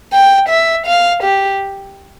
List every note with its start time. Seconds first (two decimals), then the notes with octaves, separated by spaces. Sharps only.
0.13 G5
0.49 E5
0.86 F5
1.23 G4